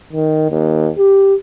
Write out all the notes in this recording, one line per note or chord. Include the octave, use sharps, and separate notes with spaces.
D#3
D#2
G4